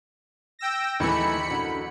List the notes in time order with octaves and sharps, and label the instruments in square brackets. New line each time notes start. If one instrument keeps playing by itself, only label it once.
[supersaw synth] G5 E6 A#6
[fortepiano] D#2 E3 [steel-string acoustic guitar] G#3 A3 E4 [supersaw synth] B5 C#7
[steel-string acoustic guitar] F#2 D3